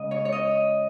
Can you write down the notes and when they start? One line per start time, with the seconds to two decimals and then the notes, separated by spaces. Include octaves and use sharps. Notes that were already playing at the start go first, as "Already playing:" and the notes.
Already playing: C#3 G#3 D#5
0.11 C#5
0.25 C#5
0.32 D#5